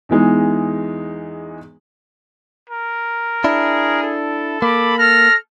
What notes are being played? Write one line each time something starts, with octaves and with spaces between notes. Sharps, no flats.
E2 E3 G#3 D#4
A#4
D4 E4 G#4
A4
A#3 B5 D6
A4 F6 A#6